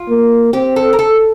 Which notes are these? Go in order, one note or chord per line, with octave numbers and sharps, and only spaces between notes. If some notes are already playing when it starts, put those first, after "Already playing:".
Already playing: F4
A#3
C4 G4
A4
A#4
A4